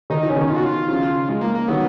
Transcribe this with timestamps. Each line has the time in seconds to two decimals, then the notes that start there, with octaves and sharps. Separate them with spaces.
0.10 D#3 D#4
0.23 F3
0.29 C#4
0.36 B2 D#3
0.50 F4
0.56 F#4
0.64 F4
0.88 C#3 F3
1.29 G#3
1.41 A#3
1.55 A#3
1.68 D#3 F#3 B3